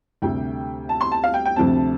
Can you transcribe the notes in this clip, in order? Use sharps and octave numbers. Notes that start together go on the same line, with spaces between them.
D2 C3 G3 G5
A5
C6
A5
F5
G5
G5
D2 C3 F3 C4 A5